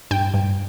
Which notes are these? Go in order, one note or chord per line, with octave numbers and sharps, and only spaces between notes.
G2 G5
G2